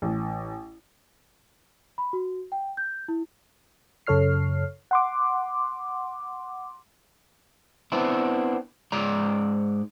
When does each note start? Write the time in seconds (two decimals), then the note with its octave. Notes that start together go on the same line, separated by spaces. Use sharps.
0.02 A1
1.98 B5
2.13 F#4
2.52 G5
2.77 G6
3.08 E4
4.07 F#2 C#3 A4 C#5 F6 C7
4.91 F#5 C6 D6
7.92 B3 C4 D4 E4
8.92 G#2 G#3 D5 A#5